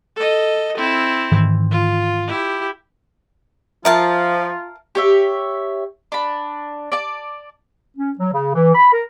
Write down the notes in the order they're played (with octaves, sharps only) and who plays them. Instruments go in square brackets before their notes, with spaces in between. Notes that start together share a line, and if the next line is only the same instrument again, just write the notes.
[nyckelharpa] A4 D#5
C4 E4
[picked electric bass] G#2 D#3 E3
[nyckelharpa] F4
E4 G4
[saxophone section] F3 [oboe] F4 [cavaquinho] A#4 F5 A5 [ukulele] E5
[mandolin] G4 C#5 E5
D4 B5
D5 A5
[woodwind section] C#4
F#3
C#3
E3
B5
A#4